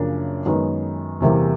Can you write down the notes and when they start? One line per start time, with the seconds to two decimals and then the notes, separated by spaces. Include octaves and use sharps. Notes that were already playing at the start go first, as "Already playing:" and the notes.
Already playing: F#2 C#3 F3 A#3 D4
0.46 F#2 D#3 G#3 B3 D#4
1.20 E2 C3 E3 G3 A#3